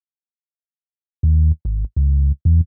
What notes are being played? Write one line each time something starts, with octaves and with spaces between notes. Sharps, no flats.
D#2
G#1
C#2
E2